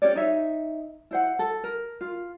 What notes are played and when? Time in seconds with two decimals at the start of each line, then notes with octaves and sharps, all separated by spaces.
0.02 C#4 G4 C#5 D5
0.15 D#4 C#5 E5
1.11 E4 C5 F#5
1.39 A4
1.64 A#4
2.01 F4